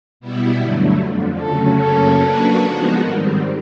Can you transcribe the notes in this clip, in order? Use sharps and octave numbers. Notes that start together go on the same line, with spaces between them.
B2 G3 B3 E4
G2 D3 F#3 A3
F2 D3 F3
C#3 F#3 A3 C#4 F#4 A4
F#2 C#3 F#3 A#3 C#4 A4
F#3 A#3 D4 F#4 B4
F3 G#3 B3 D#4 F#4
G#2 D#3 G3 C4 A#4